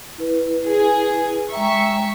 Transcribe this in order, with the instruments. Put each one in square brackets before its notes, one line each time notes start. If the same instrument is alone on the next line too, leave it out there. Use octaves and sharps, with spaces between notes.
[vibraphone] E4 B4
[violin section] G#4
[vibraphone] G#3 G5 A#5 [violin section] E5 C#6